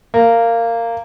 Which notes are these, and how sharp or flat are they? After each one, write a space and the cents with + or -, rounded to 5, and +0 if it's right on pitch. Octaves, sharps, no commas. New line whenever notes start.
A#3 -15